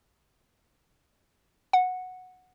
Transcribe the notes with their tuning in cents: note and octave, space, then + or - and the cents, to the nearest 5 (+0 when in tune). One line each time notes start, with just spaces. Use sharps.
F#5 -10